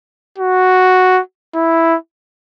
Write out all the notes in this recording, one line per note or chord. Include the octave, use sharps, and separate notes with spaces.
F#4
E4